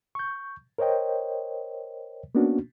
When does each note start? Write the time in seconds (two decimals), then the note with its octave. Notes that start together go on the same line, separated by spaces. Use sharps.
0.15 C#6 G6
0.78 A#4 C5 C#5 D#5 G5
2.35 A#3 B3 C#4 D4 F#4